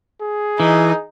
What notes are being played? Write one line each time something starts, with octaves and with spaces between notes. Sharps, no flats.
G#4
E3 D#4